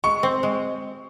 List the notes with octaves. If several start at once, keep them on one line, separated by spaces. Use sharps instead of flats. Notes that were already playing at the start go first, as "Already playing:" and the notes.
G#3 C#6
C4
G#3